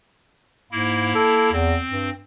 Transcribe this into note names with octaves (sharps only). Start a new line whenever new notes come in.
G#2 A#3 E4
A4
E2 C4
G2